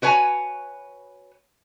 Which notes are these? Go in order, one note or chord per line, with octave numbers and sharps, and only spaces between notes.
F#4 B4 C#5 G#5